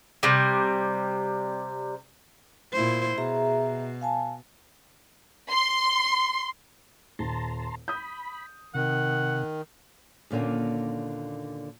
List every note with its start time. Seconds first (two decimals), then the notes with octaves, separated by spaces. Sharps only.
0.23 C3 G3
2.73 A#2 E4 C5
3.18 B2 G#4 E5 A#5
4.01 F5 G#5 A5
5.51 C6
7.19 D#1 A5 A#5 C6
7.88 B5 D#6 G6
8.75 C3 D#3 F#5
10.31 D#2 A#2 D3 A#3 C#4